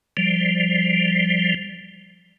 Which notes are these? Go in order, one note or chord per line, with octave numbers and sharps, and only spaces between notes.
F3 G3